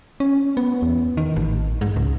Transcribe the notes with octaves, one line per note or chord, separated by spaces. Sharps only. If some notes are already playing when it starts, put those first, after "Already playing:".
C#4
B3
E2
D#3
A1
G#2
C#2